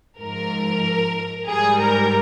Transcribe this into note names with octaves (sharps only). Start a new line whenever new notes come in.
G#2 F3 A#4
G#2 G3 G#4
A#4